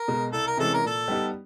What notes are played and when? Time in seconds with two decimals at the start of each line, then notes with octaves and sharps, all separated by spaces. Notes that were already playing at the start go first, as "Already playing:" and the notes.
Already playing: A#4
0.08 B2 G#3
0.32 C2 A4
0.47 A#4
0.57 C3 E3 G#3 C#4 A4
0.74 A#4
0.84 A#2 A4
1.08 G3 B3 D#4 G4